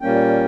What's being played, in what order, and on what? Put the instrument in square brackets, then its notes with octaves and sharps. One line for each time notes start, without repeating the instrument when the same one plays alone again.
[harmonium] A#2 G3 A#3 C#4 G5